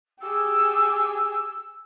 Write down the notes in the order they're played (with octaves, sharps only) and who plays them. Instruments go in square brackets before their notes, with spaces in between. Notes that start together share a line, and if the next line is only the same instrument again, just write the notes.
[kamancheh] G4 G#4 [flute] E6